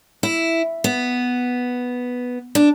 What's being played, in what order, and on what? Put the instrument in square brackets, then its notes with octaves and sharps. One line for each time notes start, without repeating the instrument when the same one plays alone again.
[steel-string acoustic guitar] E4
B3
D4